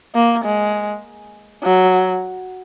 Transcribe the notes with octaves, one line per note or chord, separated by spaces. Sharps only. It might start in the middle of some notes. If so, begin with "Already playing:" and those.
A#3
G#3
F#3